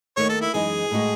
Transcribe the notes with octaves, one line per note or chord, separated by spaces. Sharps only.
D#2 D#3 A3 C#5
A4
E4
F#2 E3 G#3 D#4 G#4
A2 G#3 D#4 F#4